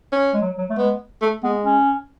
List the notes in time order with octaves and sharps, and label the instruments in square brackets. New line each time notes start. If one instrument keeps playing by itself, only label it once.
[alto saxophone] C#4
[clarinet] G#3
F#3
F#3
A3
[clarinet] G#3 [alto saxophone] B3
[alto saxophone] A3
[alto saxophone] G#3 [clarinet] B3
[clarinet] C#4